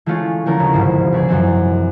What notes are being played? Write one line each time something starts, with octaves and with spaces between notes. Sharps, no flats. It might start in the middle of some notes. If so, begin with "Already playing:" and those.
E3 G#3 A3 C#4 F4
D3 E3 F3 A3 C#4 A#4
D#1 C#3 C#4
G1 C2 G#2 C5
C#2 G#4 D5
F#2 E3 C4